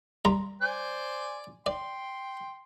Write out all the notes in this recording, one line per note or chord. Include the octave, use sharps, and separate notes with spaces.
G3 A#5 C6
C5 D5 G#5
D5 G5 C6